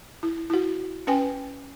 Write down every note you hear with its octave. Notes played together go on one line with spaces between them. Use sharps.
E4
E4 F#4
C#4 B4 G5 G#5